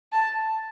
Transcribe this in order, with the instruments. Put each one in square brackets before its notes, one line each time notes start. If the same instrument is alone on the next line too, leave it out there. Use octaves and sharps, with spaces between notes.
[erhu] A5